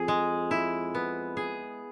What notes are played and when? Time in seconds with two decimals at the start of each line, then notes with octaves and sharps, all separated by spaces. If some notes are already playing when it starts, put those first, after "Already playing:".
Already playing: F2 G#4
0.08 G#3
0.51 E4
0.95 B3
1.37 G#4